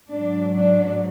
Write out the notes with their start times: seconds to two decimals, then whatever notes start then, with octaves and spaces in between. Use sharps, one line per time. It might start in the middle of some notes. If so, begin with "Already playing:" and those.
0.11 G#2 F#3 D4
0.54 D4